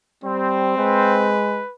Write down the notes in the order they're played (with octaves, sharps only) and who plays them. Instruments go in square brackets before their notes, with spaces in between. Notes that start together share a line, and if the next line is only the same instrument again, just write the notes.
[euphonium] G3 [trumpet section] C4 C5
[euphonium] G#3 [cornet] B4